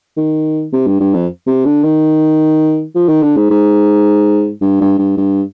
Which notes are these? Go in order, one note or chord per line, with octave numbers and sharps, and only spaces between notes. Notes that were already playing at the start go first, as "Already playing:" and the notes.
D#3
C3
G2
G2
F2
C3
D3
D#3
F3
D#3
D3
G#2
G#2
G2
G2
G2
G2